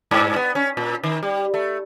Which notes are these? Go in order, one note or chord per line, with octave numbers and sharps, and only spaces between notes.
G2
B3
C#4
A#2
D#3
G3
A3